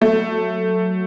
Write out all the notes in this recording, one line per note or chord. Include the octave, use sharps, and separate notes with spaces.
F#3 A3